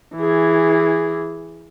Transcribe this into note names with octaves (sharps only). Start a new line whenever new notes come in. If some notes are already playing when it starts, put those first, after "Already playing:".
E3 G#4